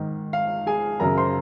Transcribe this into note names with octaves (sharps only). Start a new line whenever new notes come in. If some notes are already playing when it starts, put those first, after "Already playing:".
Already playing: G#2 D#3
F5
G#4 G#5
F#2 C#3 A#4 A#5
C5 C6